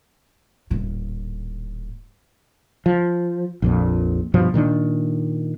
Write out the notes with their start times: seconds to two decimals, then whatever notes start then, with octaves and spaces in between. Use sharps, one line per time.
0.71 D#1 A2
2.86 F3
3.62 A#1 F2 A#2
4.34 G2 B2 F3 G3
4.54 A#2 D#3 C4 D4